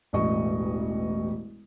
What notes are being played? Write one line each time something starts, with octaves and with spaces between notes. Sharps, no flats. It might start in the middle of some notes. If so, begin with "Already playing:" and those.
E1 A1 A3 D#5 C#6